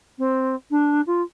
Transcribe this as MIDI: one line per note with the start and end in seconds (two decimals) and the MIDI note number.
0.18 0.55 60
0.71 1.01 62
1.06 1.22 65